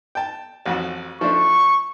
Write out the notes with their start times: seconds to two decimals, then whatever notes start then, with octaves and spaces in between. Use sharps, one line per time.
0.15 G5 A5
0.66 A1 F2 F#4
1.21 F3 A3 D4 C#6